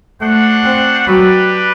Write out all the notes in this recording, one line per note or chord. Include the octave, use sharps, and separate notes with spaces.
A3 D4 F#4 C5 F#5
C4
F#3 G3 D4 G4 B4